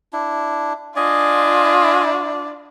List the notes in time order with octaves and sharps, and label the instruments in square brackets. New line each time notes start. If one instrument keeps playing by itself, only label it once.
[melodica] D4 E4
[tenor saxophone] D4 [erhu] F4 [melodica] D#5 G#5